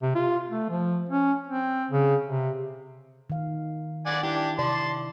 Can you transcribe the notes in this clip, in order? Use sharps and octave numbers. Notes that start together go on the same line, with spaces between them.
C3
F4
A3
F3
C#4
C4
C#3
C3
D#3 F5
D5 F#5 G#5
D4 E4 G4
C3 D5 A5 C6